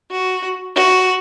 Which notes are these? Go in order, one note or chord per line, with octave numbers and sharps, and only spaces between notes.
F#4
F#4